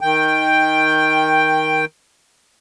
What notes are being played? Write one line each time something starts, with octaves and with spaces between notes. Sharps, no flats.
D#3 G5